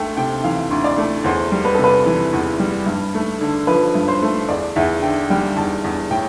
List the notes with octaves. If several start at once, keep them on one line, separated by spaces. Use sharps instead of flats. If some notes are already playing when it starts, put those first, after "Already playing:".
Already playing: D2 A3 G5
C3 G5
E3 F5
D2
D5
A3
E2 C5
G3
B4
A4
C3
B4
E3
E2
G3
G2
A3
D3
F3 B4
G2
C5
A3
E2 D5
E2 E5
D3 G5
G3 G5
E2 A5
E2
A2 G5